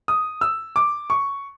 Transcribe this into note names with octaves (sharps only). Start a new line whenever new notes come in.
D#6
E6
D6
C#6